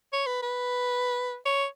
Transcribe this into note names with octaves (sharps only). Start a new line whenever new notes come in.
C#5
B4
B4
C#5